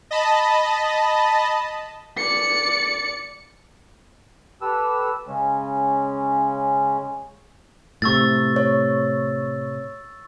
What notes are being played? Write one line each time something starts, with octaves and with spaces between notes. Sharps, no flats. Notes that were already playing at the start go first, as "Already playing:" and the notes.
D#5 A5 B5
D5 C#7
G4 A4 B4 E6
C#3 G#3 C#4
A2 C3 C#6 E6 A6
C#5